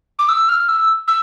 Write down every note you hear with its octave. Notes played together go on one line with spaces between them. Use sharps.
D6
E6
F6
E6
E6